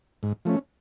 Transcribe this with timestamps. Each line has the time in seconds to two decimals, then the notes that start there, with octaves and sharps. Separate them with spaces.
0.23 G#2
0.45 F3 A3 C#4